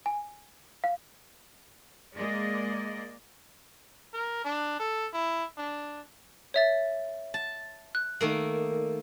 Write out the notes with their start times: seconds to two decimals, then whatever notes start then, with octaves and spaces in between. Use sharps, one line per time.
0.06 G#5
0.84 F5
2.14 G#3 A#3 G#4 D5 D#5
4.13 A#4
4.44 D4
4.80 A4
5.13 E4
5.58 D4
6.54 C#5 E5 A6
7.34 A5
7.95 F#6
8.21 D#3 A3 A#3